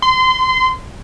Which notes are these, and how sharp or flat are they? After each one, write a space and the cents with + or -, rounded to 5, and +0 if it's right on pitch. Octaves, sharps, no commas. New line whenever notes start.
C6 -25